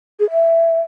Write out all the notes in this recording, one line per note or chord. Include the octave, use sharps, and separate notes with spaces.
G#4
E5